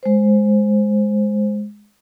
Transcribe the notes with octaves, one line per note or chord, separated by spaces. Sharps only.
G#3 C5